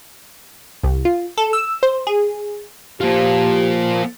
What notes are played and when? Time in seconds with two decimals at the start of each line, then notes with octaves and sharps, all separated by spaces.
0.84 C2
1.05 F4
1.37 A4
1.53 E6
1.83 C5
2.07 G#4
3.01 F3 A#3 F4 G4